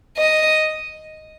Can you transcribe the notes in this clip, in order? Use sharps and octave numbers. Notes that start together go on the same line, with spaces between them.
D#5